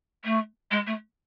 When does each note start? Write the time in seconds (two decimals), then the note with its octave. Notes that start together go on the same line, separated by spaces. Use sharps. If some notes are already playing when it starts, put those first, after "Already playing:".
0.25 A3
0.71 G#3
0.87 A3